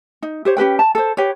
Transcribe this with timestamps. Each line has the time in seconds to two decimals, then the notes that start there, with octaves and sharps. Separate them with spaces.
0.22 D#4
0.45 G4 C5 C#5
0.57 C#4 G4 B4 G5
0.79 A5
0.95 A4 C5
1.17 G4 B4 C#5